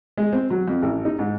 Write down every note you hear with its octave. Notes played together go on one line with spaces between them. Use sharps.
G#3
C4
F#3
F2
A1
D#4
G#2